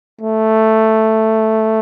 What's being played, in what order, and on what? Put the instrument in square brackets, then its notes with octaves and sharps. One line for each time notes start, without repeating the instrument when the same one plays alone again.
[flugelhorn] A3